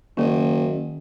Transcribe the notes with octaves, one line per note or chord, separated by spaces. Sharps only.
F#1 D#3 C#4